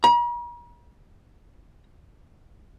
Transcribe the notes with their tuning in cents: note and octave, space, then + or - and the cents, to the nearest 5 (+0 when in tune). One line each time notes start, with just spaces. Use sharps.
A#5 +45